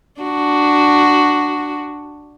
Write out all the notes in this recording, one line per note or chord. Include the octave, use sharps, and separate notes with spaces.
D4 F#4